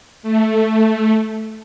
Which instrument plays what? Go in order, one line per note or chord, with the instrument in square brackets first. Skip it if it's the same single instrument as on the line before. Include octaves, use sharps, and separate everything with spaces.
[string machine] A3